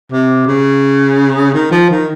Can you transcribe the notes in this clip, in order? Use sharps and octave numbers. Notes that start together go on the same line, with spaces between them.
C3
C#3
D#3
F3
D#3